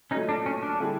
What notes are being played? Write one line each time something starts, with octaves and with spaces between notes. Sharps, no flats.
A#2 F#3 A3 C#4 D#4
D4
C#4
D4
D3 G3 C4 E4 G#4